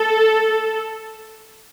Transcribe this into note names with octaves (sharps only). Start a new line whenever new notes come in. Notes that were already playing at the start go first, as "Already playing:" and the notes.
Already playing: A4